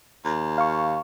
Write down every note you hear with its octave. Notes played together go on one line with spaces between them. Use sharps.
D#2
F5 C#6